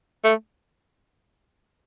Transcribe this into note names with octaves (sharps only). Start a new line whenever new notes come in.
A3